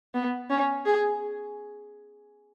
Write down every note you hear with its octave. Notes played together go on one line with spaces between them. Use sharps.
B3
C#4
G#4